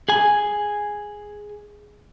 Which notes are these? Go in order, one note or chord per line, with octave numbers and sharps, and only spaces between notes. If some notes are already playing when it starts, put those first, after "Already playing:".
G#4 G#5